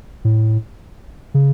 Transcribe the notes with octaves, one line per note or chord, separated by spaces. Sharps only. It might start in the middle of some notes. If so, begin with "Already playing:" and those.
A2
C#3